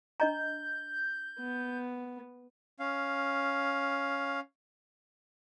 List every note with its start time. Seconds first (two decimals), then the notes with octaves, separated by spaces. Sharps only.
0.20 D4 D#5 A#5 G6
1.40 B3
2.80 C#4 F5